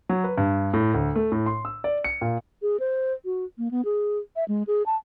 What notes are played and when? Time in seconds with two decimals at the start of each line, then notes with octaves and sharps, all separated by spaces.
0.09 F#3
0.24 B4
0.38 G2
0.73 A2
0.94 D2
1.15 A3
1.32 A2
1.46 C6
1.65 E6
1.84 D5
2.04 C#7
2.21 A#2
2.62 G#4
2.80 C5
3.25 F#4
3.58 A#3
3.71 B3
3.85 G#4
4.36 E5
4.48 G#3
4.67 G#4
4.86 A5